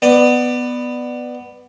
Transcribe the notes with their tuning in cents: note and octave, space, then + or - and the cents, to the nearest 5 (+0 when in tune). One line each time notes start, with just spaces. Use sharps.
B3 +5 D5 +20